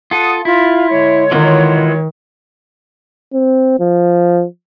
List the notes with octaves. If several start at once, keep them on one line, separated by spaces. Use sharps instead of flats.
F4 A4 F#5 D#6
E4 F4
D3 G#3 C#5
D#3 E3 F4 F#4
C4
F3